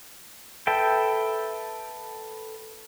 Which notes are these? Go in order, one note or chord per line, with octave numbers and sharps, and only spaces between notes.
A4 B4 E5 G5